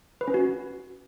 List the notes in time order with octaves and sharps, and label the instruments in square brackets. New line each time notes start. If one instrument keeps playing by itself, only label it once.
[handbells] B4
C#4
F#4